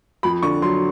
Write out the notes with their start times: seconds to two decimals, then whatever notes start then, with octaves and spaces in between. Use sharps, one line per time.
0.23 F2 B5
0.43 D3 C#6
0.62 F#3 C6